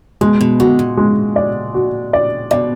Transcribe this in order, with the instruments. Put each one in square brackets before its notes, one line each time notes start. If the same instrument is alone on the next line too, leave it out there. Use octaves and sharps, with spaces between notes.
[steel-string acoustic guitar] B2 [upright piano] G#3
[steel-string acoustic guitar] B2
[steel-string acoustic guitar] D3 [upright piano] F#4
[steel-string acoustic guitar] A#2
[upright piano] G#3
D5
F#4
D5
[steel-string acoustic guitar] B2 [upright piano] D5